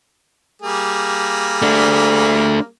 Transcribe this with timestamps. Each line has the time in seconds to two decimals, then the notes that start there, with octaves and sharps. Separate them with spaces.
0.62 G3 A#3 G#4
1.62 A3 D4